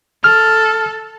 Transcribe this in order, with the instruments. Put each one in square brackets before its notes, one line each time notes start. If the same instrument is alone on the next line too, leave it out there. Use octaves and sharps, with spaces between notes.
[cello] A4 [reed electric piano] F6